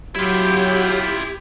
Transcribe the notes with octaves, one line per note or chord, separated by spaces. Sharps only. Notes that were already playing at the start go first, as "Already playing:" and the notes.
F#3 E4 F4 G4